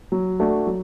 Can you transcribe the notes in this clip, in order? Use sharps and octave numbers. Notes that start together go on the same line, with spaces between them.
F#3
A3 D4 F#4 A4
F#3